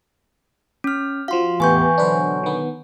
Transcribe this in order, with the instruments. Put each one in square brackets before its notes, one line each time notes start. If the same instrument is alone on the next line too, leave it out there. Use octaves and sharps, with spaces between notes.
[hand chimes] C#4 F6
[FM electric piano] F3 F4 F#4 [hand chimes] F5 C6
[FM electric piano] E2 A2 [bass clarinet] E3 [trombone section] B3 G4 [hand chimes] G#5 C#6 G6
[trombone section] B2 D3 F#3 [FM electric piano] D4 B4 C5
[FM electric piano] D#3 B3